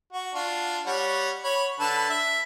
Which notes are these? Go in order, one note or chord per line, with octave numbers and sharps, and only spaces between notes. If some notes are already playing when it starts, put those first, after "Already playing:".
F#4
D4 F4
G3 C#5 F#5
C#5 B5
D3 B4 A5
E5